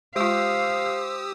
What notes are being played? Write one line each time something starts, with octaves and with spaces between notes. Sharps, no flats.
G#3 F4 G4 C5 F5 D#6 E6